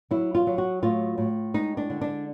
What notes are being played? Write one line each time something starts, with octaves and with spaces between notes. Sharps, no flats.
F#3 E4
F4
F#3
F#4
A2 F4
A2
G#3 D#4
D4
D3
D4